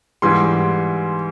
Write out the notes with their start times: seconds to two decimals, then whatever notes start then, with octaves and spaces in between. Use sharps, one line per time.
0.22 G#2 E3 G3 C6